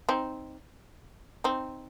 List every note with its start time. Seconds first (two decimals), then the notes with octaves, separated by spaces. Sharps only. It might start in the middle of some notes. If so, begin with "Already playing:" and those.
0.09 C4 D#4
1.44 C4 D#4